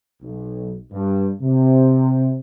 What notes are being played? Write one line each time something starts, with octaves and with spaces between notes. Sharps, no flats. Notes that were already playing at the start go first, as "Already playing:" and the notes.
B1
G2
C3